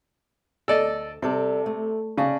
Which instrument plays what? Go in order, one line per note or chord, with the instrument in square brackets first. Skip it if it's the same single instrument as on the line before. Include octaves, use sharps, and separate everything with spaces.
[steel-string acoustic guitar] D2 [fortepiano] A4 D5 D#5
[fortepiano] C3 [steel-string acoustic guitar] G3 A4 D5
[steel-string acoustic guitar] A3
[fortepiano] C#3 [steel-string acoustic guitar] D5 A5